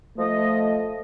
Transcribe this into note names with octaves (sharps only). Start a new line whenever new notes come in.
F3 A3 D#5